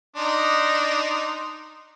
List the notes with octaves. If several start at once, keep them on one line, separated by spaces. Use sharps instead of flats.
D4 D#4 C6